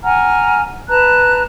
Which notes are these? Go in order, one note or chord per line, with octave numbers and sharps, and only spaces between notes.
F#5 G#5 A#5 F6
B4 A5 A#5 F#6